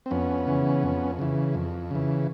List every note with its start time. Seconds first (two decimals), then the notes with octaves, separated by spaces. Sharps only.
0.06 C4
0.11 F2 B3 C#4
0.47 C#3 E3
0.83 F2
1.19 C#3 E3
1.55 F2
1.91 C#3 E3